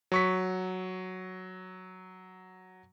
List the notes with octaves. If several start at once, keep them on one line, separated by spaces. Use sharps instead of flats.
F#3 C#6 B6